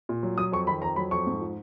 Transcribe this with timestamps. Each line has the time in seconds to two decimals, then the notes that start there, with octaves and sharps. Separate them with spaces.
0.09 A#2
0.23 F#3
0.38 F#3 D#6
0.52 F2 C#6
0.67 D#3 B5
0.82 F2 A#5
0.96 F#3 B5
1.11 F2 C#6
1.27 G#2
1.41 F3